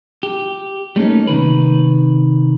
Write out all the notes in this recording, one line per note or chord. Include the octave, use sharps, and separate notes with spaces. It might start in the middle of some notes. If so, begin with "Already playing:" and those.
G4
G3 A3 A#3 C#4 D#4
C3 D#3 B4